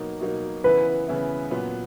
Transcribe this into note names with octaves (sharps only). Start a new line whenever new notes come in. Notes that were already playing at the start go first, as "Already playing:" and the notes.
Already playing: B2 F#3 A#3 D#4
B2 F#3 A#3 D#4
C#3 E3 B3 E4 B4
C#3 E3 B3 E4
A#2 F#3 B3